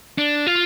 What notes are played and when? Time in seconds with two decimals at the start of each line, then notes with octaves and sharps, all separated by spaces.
0.18 D4
0.47 F4